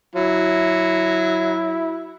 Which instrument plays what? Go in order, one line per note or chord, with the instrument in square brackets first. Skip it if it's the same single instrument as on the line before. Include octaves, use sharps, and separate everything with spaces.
[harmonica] F#3 [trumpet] E4